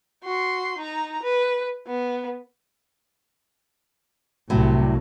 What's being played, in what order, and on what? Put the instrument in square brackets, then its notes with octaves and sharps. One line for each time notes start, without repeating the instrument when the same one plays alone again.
[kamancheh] F#4 C6
D#4 A#5
B4
B3
[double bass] C2 C3 [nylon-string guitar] A2 F#3